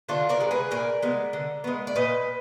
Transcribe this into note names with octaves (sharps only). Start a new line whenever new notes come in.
D3 D4 F4
A#4 D5
G#3 B3
G#4 B4
A#2 A#4 D5
G#3 B3
D3
G#3 B3
D5
A#2 B4 D#5